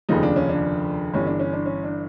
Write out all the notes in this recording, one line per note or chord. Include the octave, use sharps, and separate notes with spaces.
F1 D#2 C#3 F3 D#4
D4
C#4
D4
G1 G2 E3 C#4
D4
C#4
D4
C#4
D4